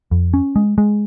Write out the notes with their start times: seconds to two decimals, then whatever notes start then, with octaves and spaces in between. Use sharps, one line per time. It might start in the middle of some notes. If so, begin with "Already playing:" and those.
0.11 F2
0.34 C#4
0.56 G#3
0.78 G#3